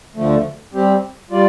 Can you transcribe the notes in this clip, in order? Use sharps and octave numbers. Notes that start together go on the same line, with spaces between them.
D2 D3 F3 A3
G3 C4 G4
G3 F4 D5